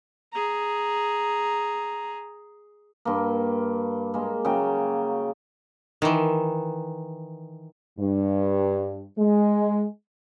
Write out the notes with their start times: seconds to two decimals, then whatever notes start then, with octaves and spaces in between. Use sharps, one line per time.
0.33 G#4 A#5
3.05 G2 A#3
4.14 G#3 A#3
4.45 C#3 F#3 A#3 G5
6.02 D#3 E3
7.99 G2
9.18 G#3